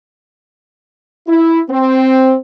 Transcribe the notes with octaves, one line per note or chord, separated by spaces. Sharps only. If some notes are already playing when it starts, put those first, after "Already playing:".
E4
C4